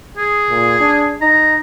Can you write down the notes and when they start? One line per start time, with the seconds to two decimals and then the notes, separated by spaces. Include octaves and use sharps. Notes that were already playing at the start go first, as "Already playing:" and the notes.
0.17 G#4
0.50 A#2
0.80 D4
1.21 D#4 A#5